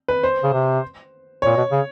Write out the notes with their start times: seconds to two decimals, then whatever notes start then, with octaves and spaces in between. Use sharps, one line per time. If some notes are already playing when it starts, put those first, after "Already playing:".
0.08 B4
0.23 C5
0.43 C#3
0.53 C3
1.42 A#2 C#5
1.57 B2
1.71 C#3